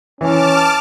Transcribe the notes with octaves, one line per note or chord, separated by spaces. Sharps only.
E3 C#4 A5 D6 F6